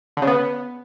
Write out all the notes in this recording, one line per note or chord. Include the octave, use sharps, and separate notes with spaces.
D3
C#3
B3